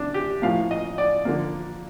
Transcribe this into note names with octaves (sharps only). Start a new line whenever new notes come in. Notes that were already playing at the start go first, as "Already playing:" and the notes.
Already playing: C3 D4
G4
A2 F3 A#3 F5
D#5
D5
D3 F3 A#3